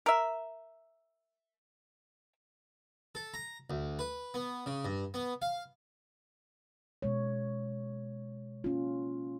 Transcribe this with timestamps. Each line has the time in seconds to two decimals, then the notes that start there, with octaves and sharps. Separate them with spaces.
0.06 A#4 E5
3.15 A4
3.34 A#5
3.70 D2
3.99 B4
4.34 B3
4.66 C#3
4.85 G2
5.14 B3
5.42 F5
7.02 B2 G#3 C#5
8.64 A#3 C#4 F4